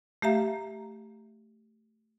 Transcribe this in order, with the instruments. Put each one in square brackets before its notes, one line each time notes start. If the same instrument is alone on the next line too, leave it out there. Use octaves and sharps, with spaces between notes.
[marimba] A3 G4 E5 F5 A#5